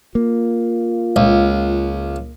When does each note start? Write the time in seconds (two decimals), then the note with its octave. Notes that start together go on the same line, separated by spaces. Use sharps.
0.15 A#3 F4
1.16 C#2